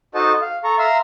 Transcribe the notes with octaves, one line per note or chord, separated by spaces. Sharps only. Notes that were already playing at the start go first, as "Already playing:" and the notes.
D#4 F#4 A4 C5 D#5 A5
F5
A4 A#5 C#6
E5 F5 A#5 C6 E6